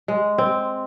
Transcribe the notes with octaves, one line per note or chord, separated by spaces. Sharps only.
G#3
C4